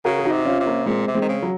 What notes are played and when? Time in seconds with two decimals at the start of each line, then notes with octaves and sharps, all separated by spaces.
0.05 C#3 F#4 A#4
0.19 G#4
0.25 D#4 F#4
0.31 C3
0.45 C#4 F4
0.60 C3
0.66 A#3 C#4
0.86 A#2 G#3 C4
1.07 C3
1.15 G#3 C4
1.21 D#3
1.28 C#3
1.43 F#3